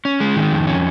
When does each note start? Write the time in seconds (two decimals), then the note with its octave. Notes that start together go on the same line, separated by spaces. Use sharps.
0.05 C#4
0.20 G#3
0.36 D#3
0.52 F2
0.67 C#4